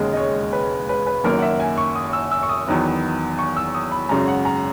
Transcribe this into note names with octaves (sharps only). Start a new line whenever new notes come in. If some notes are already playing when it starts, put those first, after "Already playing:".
Already playing: E1 D#2 C#3 G#3 D#5
D#5
C#5
B4
B4
B4
F#1 F#2 D#3 A#3 A#4
F#5
E5
G#5
C#6
D#6
E6
E6
C#6
D#6
E2 D#3 F#3 B3
C#6
E6
D#6
B5
G#1 F#2 C#3 A#5
F#5
A#5